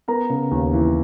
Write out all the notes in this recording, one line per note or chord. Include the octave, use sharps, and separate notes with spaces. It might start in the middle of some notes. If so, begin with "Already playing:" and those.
B3 A#4 A#5
C#3
D#2
E3